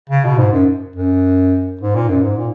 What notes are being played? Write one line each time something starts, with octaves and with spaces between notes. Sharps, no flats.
C#3
B2
G#2
F#2
F#2
G#2
A#2
F#2
G#2
A#2